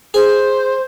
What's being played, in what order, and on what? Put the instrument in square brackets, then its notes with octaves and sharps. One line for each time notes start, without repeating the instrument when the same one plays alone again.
[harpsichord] G#4 [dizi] C5